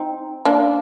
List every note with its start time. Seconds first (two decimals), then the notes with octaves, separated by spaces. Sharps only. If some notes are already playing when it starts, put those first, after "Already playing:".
Already playing: C4 D#4
0.45 A#3 D4